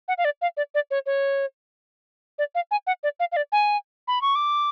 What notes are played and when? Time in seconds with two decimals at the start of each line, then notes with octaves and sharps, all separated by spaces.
0.08 F#5
0.18 F5
0.25 D5
0.42 F5
0.57 D5
0.75 D5
0.91 C#5
1.06 C#5
2.39 D5
2.55 F5
2.71 G#5
2.87 F#5
3.03 D5
3.20 F5
3.32 F5
3.36 D5
3.52 G#5
4.08 B5
4.22 C#6
4.35 D6